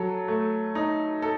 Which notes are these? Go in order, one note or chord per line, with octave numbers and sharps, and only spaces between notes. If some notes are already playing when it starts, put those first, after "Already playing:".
Already playing: F#3 A4
A3
D#4
A4